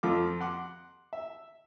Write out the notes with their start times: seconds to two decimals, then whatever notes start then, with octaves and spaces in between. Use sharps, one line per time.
0.03 F2 F3 F4 A4 D6
0.40 F#5 C6 D6
1.13 E5